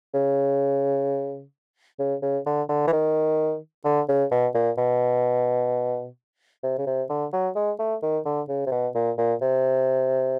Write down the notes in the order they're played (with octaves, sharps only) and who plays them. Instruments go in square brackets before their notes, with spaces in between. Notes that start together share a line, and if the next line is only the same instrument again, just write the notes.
[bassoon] C#3
C#3
C#3
D3
D3
E3
D#3
D3
C#3
B2
A#2
B2
C3
C#3
C3
D3
F#3
G#3
A3
D#3
D3
C#3
C3
B2
A#2
A#2
C3